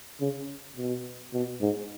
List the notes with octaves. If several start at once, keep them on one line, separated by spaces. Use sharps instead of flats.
C#3
B2
B2
G#2